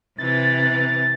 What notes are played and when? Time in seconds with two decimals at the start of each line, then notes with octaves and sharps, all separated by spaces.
0.18 C3 E3 A6